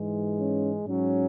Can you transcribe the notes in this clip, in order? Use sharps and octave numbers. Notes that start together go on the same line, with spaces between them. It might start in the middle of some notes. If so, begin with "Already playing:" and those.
Already playing: G#2 E3 G#3
C#4
G#2 F#3 C#4